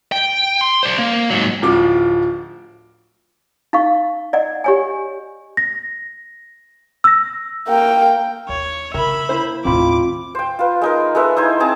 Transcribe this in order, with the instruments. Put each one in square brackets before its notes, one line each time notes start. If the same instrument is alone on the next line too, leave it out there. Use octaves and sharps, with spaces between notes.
[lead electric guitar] G5
C6
C5 D5
A#3
G#2 F#3
[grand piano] D1 F3 D6
[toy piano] D#4 F5 C#6
D5 D#5 F#5
G4 C#5 G#5
[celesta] A#6
E6 A#6
[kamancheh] A#3 G5
[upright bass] D#2 [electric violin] C#5
[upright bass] C#3 [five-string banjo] A#4 [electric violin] E5 B5
[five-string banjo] A#3 E4 C5
[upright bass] D#2 A2 [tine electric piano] C4 F4 B5 [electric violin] D6
[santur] C5 G5
F4 B4
G#3 D#4 A#4
G#3 A4 B4 E5
D#4 E4 C5 G#5
C4 G#4 A5 A#5